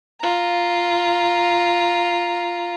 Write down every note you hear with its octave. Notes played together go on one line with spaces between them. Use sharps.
F4 A#5